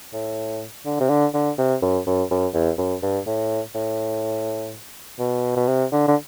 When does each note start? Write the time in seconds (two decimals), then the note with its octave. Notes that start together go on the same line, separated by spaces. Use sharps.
0.13 A2
0.85 D3
1.00 C3
1.09 D3
1.34 D3
1.58 C3
1.82 F#2
2.07 F#2
2.30 F#2
2.54 E2
2.78 F#2
3.02 G2
3.27 A2
3.74 A2
5.19 B2
5.56 B2
5.68 C3
5.92 D3
6.08 D3